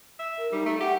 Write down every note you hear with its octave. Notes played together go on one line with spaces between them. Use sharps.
E5
A#4
G3 D#4
A3
G4 F#5